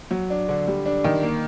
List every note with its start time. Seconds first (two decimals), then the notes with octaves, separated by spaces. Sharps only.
0.11 F#3
0.30 D4
0.49 D3
0.68 G3
0.86 D4
1.04 D#3
1.23 A#3